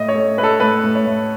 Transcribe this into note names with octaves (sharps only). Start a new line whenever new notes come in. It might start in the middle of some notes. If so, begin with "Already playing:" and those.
Already playing: A2 D#5
C#5
A3
A3 B4
A4
A2 B4
A2
C#5
A2